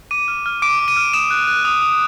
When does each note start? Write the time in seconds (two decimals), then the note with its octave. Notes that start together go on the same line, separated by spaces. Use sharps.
0.11 D6 D#7
0.28 F6
0.46 F6
0.62 D6 D7
0.79 D6
0.88 D#7
0.97 F6
1.14 D#6 E7
1.31 F#6
1.47 F#6
1.65 D#6
1.82 D#6